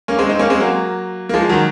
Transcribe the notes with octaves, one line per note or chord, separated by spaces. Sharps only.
A#3 C#4
G#3 C4
C4 D#4
A#3 C#4
G#3 C4
F#3 A#3
A#3
F3 G#3
D#3 F#3